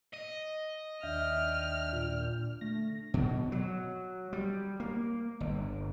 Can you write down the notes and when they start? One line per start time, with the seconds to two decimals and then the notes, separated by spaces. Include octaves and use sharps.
0.14 D#5
1.03 D#2 D4 E5 G5 F6
1.93 A#2
2.61 D3 A3 A#6
3.14 B2
3.52 F#3
4.33 G3
4.80 A#3
5.40 G1